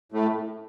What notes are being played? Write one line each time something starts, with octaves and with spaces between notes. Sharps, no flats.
A2 A3